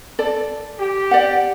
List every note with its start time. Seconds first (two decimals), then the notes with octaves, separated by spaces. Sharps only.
0.19 A4 D5
0.79 G4
1.11 D5 F#5